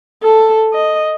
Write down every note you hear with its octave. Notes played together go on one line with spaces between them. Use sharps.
A4
D#5